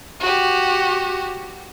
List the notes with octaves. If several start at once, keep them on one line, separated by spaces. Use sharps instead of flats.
F#4 G4